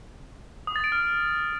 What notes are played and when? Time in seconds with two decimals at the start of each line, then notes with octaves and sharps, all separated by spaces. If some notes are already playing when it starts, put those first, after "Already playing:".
0.67 D#6
0.76 A6
0.84 D7
0.92 F6